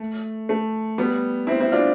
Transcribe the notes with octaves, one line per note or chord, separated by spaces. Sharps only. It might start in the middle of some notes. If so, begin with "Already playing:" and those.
Already playing: A3
A3
G3 B3
C4 E4
C4 E4
D4 F4